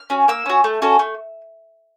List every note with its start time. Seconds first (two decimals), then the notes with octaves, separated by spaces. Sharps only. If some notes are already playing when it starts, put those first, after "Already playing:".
Already playing: F6
0.10 C#4 F#4
0.28 A#3 E6
0.46 C#4 F#4
0.64 A3
0.82 C#4 F#4 A4
0.99 A3